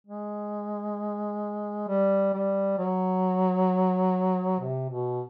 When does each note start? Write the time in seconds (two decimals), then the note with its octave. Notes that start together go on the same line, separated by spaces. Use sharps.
0.07 G#3
1.88 G3
2.34 G3
2.78 F#3
4.60 C3
4.90 B2